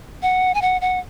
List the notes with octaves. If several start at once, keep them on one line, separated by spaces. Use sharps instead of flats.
F#5
G#5
F#5
F#5